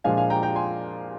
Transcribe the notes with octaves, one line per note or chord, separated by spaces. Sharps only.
A#2 F3 G#3 D4 F4 F5 G#5
F5 G#5
G5 A#5
G5 A#5
G#5 C6